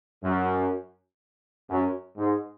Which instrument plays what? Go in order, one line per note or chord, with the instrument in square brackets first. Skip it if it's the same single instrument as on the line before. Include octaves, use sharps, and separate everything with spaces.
[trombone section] F#2
F#2
G#2